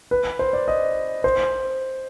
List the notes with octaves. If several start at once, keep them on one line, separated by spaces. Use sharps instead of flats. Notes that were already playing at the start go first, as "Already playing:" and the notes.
B4
C5
D5
D#5
C5